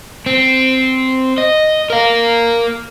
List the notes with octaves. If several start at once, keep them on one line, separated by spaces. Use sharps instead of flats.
C4
D#5
A#4 F5